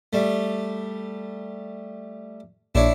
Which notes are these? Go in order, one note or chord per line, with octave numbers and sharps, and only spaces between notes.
G3 A3
A#1 D4 E4 C#5